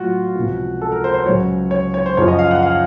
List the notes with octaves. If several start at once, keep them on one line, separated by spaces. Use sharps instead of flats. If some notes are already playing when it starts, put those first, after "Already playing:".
Already playing: A2 F#3 F4 F#4
C#2 C3 F3
A4
A#4
C5
C5
C#2 C#3 F#3 C#5
C#5
C#5
C5
F#2 C#3 F3 C#5
D#5
F5
F#5
F5